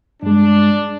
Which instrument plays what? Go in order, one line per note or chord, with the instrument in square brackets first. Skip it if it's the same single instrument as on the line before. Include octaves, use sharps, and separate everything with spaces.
[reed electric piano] G2 G#3 [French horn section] D4